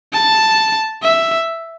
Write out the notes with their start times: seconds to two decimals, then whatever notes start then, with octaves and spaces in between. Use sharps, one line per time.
0.13 A5
1.03 E5